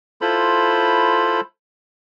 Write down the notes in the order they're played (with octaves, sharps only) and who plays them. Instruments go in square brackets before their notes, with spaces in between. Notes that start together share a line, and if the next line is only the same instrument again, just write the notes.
[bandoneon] E4 F4 A4 C5 B5